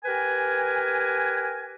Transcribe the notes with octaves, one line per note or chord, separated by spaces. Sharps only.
G4 A#4 B4 G#5